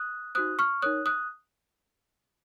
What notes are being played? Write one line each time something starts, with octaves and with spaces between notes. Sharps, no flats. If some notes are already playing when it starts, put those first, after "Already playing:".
Already playing: D#6 F#6
D#4 F#4 C5 D#6 F#6
C#6 F6
D#4 A#4 C#5 D#6 F#6
D#6 F#6